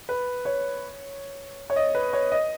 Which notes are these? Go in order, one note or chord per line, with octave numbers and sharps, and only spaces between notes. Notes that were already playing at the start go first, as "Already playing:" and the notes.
B4
C#5
C#5
D#5
B4
C#5
D#5